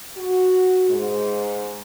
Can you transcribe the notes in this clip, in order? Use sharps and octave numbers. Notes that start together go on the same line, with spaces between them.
F#4
G#2